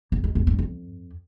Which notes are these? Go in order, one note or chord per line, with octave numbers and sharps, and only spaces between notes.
E2
G#3
E2
G2
F2